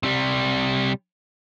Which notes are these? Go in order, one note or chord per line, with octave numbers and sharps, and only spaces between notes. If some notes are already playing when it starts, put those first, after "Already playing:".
C3 G3